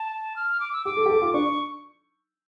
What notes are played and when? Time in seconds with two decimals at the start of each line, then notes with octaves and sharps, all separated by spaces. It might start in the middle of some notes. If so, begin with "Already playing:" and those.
Already playing: A5
0.36 F6
0.60 D6
0.73 E6
0.85 G4 D6
0.97 A4
1.06 G4
1.09 A4
1.22 F4
1.33 D4 C#6